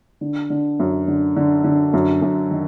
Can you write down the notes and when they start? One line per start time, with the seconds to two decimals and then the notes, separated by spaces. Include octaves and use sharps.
0.21 D3
0.50 D3
0.79 F#2
1.08 D3
1.36 D3
1.64 D3
1.93 F#2
2.22 F#2
2.51 D#3